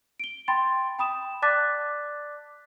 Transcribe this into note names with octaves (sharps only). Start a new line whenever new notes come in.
D7 G7
G5 B5 C6 A6
G5 B5 D#6 E7
D5 A5 D6 F#6 A6 B6